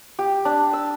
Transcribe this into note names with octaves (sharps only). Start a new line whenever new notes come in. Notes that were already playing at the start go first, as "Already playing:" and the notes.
G4
D4
E6